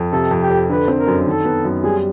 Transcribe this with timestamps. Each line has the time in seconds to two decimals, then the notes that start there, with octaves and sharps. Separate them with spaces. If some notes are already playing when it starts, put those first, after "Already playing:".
Already playing: F2
0.12 C3 A4
0.31 F2
0.41 G4
0.50 F2
0.69 D3 B4
0.88 C4
0.97 A#4
1.07 F#2
1.26 D#3 A4
1.45 B3
1.65 F#2
1.84 G3 G#4